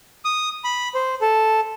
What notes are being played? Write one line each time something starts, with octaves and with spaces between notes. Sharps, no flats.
D#6
B5
C5
A4